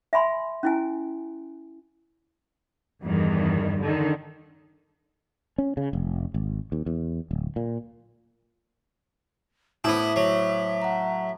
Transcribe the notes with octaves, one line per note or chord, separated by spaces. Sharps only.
E5 G#5 B5 C6
C#4 E4 G#5
E2 G2 D#3
D3 D#3
C#4
C#3
F1
G#1
D#2
E2
D1
A#2
A2 B3 E4 C5 E5 D6 D#6
F#3
F#5 A#5